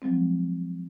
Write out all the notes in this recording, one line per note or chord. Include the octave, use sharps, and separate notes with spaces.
F3 F#3 G#3 C4